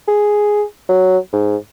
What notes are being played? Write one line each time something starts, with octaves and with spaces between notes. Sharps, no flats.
G#4
F#3
G#2